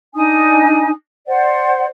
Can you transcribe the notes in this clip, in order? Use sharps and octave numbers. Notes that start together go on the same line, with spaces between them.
D4 D#4 G#5 D#6
C5 D5 F#5